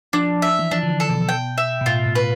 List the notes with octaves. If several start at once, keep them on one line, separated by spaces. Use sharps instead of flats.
F3 D4
E5
E3
F3 D4
D3
E3
A4
B2
G5
E5
B2
A2 F4
A2
B4